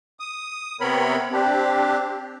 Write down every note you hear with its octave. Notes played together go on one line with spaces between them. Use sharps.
D#6
C3 B3 C4 A#4 C#5 B5
C4 D4 G4